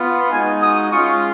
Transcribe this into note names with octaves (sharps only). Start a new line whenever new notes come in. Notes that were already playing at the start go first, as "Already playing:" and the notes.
Already playing: B3 F4
G#3 D#4 F#4 G#5
D#6
G#3 C#4 F4 C#6